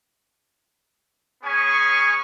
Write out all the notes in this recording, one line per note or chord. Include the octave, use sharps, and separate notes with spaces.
B3 C#4 G#4 C#5 G#5 C#6